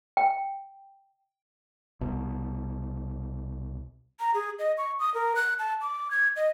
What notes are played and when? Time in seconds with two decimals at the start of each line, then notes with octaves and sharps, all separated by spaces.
0.17 G5
2.01 C2 B2
4.19 A#5
4.34 G#4
4.59 D#5
4.78 C#6
5.00 D#6
5.14 A#4
5.36 F#6
5.59 A5
5.81 D6
6.11 G#6
6.36 D#5